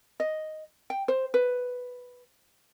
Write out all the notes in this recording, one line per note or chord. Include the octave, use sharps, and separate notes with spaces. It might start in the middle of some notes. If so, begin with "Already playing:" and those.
D#5
G5
C5
B4